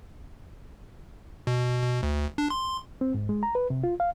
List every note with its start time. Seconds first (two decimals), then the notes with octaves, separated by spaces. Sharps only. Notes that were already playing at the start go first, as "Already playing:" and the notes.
1.47 B2
1.83 B2
2.03 D2
2.38 D4
2.50 C6
3.01 C4
3.14 G#2
3.29 G#3
3.43 A#5
3.55 B4
3.70 C3
3.84 F4
4.00 F5